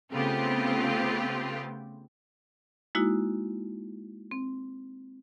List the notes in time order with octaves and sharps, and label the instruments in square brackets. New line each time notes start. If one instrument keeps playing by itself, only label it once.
[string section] C#3 A3 B3 C4 F4 G4
[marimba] G#3 A#3 D#4 E4 F#4
C4